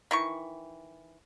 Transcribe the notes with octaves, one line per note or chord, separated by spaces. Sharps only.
D#3 E3 C#6